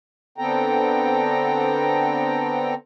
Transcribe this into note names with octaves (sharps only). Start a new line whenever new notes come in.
D3 B3 C4 A4 G5 A#5